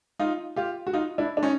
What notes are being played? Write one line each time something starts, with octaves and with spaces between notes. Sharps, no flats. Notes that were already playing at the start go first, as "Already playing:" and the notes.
D#4 F4
F4 G4
F#4
D#4 F4
D4 E4
D4
C#4 D#4